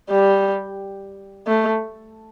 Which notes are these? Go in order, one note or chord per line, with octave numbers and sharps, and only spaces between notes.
G3
A3